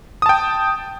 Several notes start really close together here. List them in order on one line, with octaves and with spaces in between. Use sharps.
D#6 A5 G5